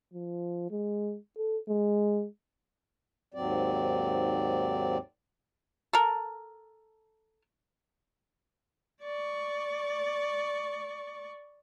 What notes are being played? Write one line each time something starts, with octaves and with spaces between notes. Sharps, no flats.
F3
G#3
A4
G#3
D#2 G#2 F#3 C4 D5
A4 A#4
D5 C#6